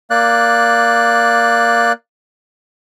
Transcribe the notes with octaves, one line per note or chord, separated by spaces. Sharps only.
A#3 D5 F#6